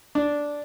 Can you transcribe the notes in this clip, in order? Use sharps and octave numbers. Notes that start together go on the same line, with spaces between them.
D4